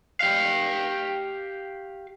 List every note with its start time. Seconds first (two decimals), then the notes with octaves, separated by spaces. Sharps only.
0.21 G4 F5